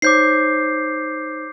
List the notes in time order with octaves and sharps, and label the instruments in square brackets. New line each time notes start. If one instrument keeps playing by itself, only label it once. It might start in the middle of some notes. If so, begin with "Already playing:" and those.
[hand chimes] D#4 C5 C#5 [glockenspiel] D6 G6 C7